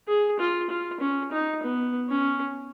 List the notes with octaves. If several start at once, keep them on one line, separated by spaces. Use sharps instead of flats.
G#4
F4
F4
C#4
D#4
B3
C#4